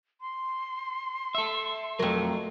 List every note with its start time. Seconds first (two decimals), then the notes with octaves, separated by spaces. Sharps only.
0.21 C6
1.35 A4 E5
1.99 F2 F#3 A3 A#4